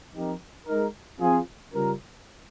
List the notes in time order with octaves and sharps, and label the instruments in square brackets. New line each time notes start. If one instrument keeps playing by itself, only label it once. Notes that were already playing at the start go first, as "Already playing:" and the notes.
[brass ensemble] F3 C4 D#4 G4 A#4
G#3 D#4 A#4
F3 C4 F4 G#4
C#3 G3 C#4 F4 A#4